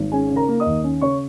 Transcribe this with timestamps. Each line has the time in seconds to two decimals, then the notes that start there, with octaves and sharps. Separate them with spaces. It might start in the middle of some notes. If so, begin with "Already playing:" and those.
Already playing: G#1
0.12 C#4 G#4 G#5
0.30 C#3
0.36 A#4 A#5
0.48 A#3
0.60 D#5 D#6
0.66 D#2
0.84 C#4
1.01 C#3 C#5 C#6